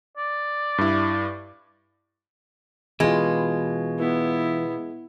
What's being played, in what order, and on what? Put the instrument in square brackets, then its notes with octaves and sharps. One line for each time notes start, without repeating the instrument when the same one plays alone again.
[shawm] D5
[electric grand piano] G2 E4
[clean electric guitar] B2 [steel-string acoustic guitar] E3 F4 [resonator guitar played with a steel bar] G#3
[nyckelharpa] B3 E4